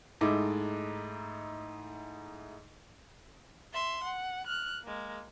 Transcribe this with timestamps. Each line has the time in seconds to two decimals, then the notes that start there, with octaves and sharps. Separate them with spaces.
0.21 G#2 A3 D#4 E4 D6
3.73 E5 C6
4.04 F#5
4.47 F6 F#6
4.84 G#3 A#3